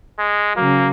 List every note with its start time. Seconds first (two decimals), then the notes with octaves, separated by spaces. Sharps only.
0.19 G#3
0.56 C#3 F#3 A#3